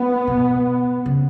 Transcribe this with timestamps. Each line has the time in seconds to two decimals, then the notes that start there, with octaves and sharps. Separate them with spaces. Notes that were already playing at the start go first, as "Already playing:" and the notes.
Already playing: B3
0.27 B2
1.06 C#3